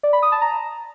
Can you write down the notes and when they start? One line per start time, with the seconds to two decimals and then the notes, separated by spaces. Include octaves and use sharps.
0.03 D5
0.13 B5
0.22 D#6
0.32 A5
0.42 A#5